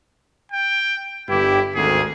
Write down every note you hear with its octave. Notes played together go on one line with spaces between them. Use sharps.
G5
G1 G2 E4 G4
G#1 D2 G#4